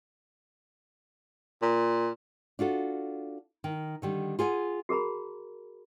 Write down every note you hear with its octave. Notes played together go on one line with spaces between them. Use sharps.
A#2
D4 F4 F#4 A4
D#3
D3 D#3 G3
F4 G#4 F#5 G#5
F#4 G#4 A#4 A#5 B5